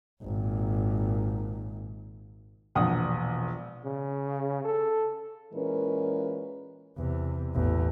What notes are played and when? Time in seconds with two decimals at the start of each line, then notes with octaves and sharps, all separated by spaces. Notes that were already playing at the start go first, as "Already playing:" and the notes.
0.23 G#1 A#2
2.75 E1 A#1 F#5 D#6
3.85 C#3
4.64 A4
5.53 A#2 E3 G#3 C#4 A#4 B4
6.98 E2 C3
7.55 A1 E2